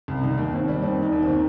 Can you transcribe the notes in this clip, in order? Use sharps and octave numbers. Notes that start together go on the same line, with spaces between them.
C2
D#3 D#4
D#2
D#2 C4
G3
D#2 C4
D#2 D#4
D#2
C4
D#3